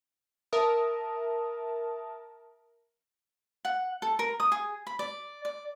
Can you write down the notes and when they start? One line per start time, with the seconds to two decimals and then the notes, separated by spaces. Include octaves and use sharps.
0.53 A#4 E5 A5 D#6
3.65 F#5
4.02 A4
4.19 A#4
4.40 D#6
4.52 G#4
4.87 B5
4.99 D5
5.45 D5